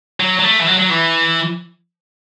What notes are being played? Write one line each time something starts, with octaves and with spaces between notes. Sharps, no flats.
F#3
F#3
A3
E3
F#3
F#3
E3